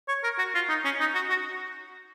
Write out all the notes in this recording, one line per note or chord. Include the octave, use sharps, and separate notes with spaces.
C#5
A#4
F#4
F4
D#4
C#4
D#4
F#4
F#4